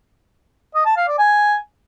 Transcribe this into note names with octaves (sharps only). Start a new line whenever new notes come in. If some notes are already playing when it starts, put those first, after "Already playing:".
D#5
A5
F5
D5
G#5